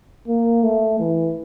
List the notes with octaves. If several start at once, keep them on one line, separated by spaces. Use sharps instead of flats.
A#3
A3
E3